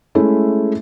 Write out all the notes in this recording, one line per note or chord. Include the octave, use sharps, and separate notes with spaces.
G#3 A3 C#4 E4